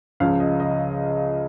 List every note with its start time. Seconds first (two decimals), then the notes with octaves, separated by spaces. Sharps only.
0.20 C#2 C#3 F3 F5
0.40 D#5
0.60 D#5